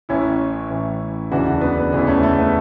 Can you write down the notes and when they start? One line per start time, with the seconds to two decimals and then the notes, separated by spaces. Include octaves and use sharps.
0.09 A1 A2 E3 C#4 E4
0.70 A1 A2 E3
1.31 E1 D2 C#3 E3 D4 F#4
1.46 D4 F#4
1.61 B3 D4
1.78 B3
1.92 E1 D2 C#3 E3 B3
2.07 A3 C#4
2.23 A3
2.39 B3